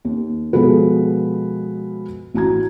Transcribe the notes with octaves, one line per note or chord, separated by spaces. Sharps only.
D#2
B2 F3 G#3 B3 A4 B4
A1 F#4 A#5 G#6